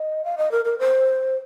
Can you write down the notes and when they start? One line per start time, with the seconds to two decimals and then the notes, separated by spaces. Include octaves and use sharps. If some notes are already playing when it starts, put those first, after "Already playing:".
Already playing: D#5
0.24 F5
0.38 D#5
0.51 A#4
0.65 A#4
0.79 C5